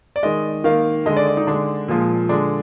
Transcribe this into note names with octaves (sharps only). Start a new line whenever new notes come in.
D5
D#3 G#3 D#5
D#3 A#3 F5
D3 G#3 D#5
D5
D5
D#4
D3 G#3 D4
A#2 F3 G#3
D3 G#3 D4